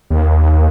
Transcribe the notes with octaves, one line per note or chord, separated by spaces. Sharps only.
D#2